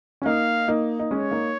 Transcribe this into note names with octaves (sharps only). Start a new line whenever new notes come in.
C#4
A#3 D#4 F5
A#3 D#4
D#4
G#3 C#4 C#5
A#3 D#4